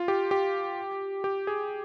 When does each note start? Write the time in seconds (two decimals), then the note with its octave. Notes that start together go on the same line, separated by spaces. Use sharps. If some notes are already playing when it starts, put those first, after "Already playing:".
Already playing: F4
0.08 G4
0.31 G4
1.24 G4
1.47 G#4